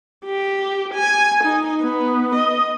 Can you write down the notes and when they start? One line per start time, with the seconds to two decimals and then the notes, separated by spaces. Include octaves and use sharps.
0.25 G4
0.94 G#5
1.44 D#4
1.82 B3
2.35 D#5